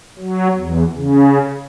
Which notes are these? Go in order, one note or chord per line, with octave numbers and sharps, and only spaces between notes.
F#3
E2
C#3